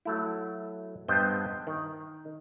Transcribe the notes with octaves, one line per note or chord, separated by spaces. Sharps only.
F#3 A3 E4
G2 B3 C5 D#5 G5 A5
D#3